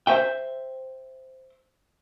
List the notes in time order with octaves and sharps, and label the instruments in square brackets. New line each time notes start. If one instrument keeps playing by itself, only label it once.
[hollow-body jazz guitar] C5 E5 G5